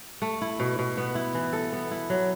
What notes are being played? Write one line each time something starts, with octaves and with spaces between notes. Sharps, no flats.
A3
E4
B2
B2
B3
E4
E3
A4
B3
E4
F#3